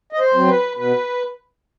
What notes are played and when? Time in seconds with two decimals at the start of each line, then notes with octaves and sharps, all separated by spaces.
0.13 D#5
0.19 C5
0.34 F#3 C4
0.48 B4
0.77 B2 B4